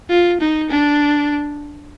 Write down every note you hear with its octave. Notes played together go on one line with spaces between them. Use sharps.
F4
D#4
D4